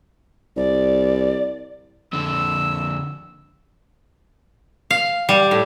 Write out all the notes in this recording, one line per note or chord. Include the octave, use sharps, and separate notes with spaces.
C2 D5
F2 D3 E6
F5
G3
A2